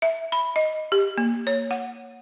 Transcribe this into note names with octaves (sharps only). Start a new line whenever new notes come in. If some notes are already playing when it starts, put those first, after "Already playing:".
E5
B5
D#5
G4
A#3
C#5
F#5